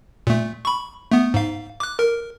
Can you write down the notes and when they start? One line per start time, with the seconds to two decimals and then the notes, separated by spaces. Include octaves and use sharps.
0.27 A#2 A3
0.65 B5 C#6
1.11 A3 B3
1.34 G#2 F5
1.80 D6 F#6
1.99 A#4